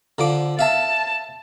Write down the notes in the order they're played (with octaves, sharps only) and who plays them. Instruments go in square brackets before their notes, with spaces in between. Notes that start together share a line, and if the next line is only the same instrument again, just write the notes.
[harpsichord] D3 F3 D6
[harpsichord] E5 F5 [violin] A5